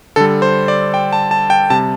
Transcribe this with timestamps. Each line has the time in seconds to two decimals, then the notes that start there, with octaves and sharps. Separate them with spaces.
0.16 D3 G3 A4
0.42 C5
0.68 D5
0.94 G5
1.13 A5
1.31 A5
1.50 G5
1.70 C3 G3 A5